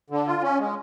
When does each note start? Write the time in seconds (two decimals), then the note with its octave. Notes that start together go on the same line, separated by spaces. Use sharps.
0.10 D3
0.27 F4
0.43 C#4
0.59 G#3